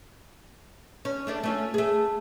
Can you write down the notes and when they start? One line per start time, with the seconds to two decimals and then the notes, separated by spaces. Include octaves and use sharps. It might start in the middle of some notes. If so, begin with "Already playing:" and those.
1.05 C#4
1.27 A3 D4 D5
1.44 A3 C#4 F4
1.74 A3 G#4